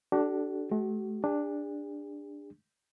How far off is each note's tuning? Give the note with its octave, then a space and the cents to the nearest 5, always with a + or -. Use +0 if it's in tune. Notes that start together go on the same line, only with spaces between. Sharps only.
D4 +0 F#4 +40 A4 -25
A3 -45 F#4 +35
D4 +0 G#4 -45